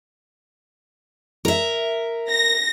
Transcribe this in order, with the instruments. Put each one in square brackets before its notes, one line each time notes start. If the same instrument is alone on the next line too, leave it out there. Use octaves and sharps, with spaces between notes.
[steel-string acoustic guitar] A#4 E5
[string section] A#6